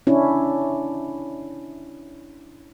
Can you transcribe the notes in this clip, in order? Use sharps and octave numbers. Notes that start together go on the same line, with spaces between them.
C#4 D4 E4